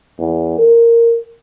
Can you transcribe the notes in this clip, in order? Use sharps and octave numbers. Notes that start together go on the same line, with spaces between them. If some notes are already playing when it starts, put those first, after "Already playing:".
E2
A#4